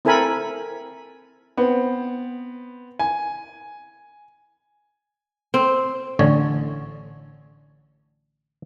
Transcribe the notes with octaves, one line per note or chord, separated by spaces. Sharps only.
C4 E4 A4 A#4 G#5 B5
B3 C4
G#5
C4
A1 D3 C#5